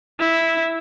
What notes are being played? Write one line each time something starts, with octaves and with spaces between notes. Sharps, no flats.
E4